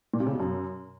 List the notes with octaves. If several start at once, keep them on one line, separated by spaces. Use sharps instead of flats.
A#2
C3
C#3
B2
F#2